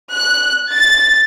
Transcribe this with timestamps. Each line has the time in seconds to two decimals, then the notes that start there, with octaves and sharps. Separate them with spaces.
0.14 F#6
0.74 A6